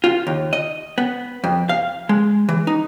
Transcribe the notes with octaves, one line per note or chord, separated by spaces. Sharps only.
F4
D#2
D#5
B3
F2
F5
G#3
E3
D#4